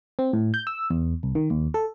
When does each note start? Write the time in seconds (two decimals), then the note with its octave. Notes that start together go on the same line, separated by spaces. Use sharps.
0.19 C4
0.33 A2
0.54 G6
0.67 E6
0.90 E2
1.23 C2
1.35 D#3
1.50 D#2
1.74 A4